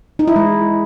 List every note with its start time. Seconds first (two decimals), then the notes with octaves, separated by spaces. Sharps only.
0.19 D#4
0.28 E4
0.36 G#3